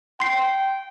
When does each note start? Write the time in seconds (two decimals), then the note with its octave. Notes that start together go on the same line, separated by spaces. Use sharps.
0.20 G5 C6 C7